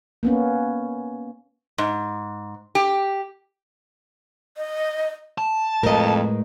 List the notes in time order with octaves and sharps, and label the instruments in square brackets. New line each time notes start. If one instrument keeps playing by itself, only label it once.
[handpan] A#3 B3 C#4
[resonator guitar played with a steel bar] G#2
G4
[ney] D#5
[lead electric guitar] A5
[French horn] F2 [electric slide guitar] A2 G#3 B4 [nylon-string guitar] A#4 D#5